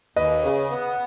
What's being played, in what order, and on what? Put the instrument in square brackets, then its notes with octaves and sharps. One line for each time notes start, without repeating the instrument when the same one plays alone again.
[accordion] D#2 [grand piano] B4 D#5
[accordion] C#3
B3